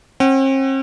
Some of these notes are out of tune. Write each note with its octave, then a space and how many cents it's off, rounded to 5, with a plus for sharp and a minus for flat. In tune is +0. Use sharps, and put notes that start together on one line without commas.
C4 +45 F#5 +40